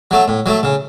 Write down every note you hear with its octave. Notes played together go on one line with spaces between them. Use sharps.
F#3 A3
A2
F#3 A3
C#3